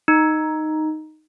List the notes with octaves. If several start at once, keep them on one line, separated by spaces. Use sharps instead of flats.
D#4